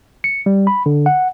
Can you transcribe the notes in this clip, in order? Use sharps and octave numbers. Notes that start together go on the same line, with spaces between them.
C#7
G3
B5
D3
F#5